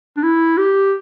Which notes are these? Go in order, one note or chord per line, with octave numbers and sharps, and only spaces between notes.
D4
E4
G4